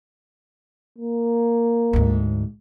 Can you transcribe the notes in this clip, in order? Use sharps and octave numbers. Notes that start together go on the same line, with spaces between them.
A#3
D2 G#2